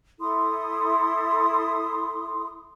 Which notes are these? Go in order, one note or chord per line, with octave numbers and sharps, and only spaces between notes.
E4 A4 C6 D#6